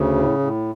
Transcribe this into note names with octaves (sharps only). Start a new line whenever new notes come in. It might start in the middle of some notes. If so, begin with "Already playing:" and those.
Already playing: D2 C#3
A2
A2